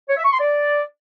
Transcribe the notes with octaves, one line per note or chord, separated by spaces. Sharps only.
C#5
E5
C#6
C6
D5